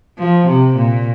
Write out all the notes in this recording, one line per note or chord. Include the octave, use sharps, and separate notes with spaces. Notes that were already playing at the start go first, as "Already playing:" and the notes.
F3
C3
A#2